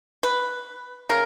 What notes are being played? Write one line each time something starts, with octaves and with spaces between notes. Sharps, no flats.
B4
C#3 A#4